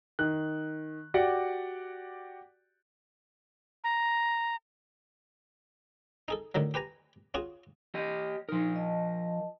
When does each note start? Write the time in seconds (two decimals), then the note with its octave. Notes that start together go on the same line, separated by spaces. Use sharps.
0.19 D#3 F#6
1.14 F#4 G4 D5 F#5
3.84 A#5
6.28 D#4 G#4 A4
6.55 A2 D3 D#3 F#3
6.74 G4 B4 G#5 A#5
7.34 C#4 F4 F#4 G#4
7.95 G4 D#5
8.49 F3 D#4 A#4
8.75 D#5 A5